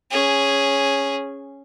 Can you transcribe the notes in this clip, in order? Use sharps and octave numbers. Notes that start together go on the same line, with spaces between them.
C#4 G#4